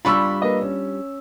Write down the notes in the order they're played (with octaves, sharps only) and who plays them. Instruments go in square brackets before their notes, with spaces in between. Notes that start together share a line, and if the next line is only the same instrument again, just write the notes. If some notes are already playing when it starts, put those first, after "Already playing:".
[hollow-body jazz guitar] G3 D4 F4 [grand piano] B5 C#6 E6
[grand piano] A#3 B4 D#5
C#4